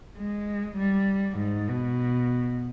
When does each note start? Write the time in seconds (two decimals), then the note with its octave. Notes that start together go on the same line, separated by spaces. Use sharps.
0.17 G#3
0.77 G3
1.38 G#2
1.69 B2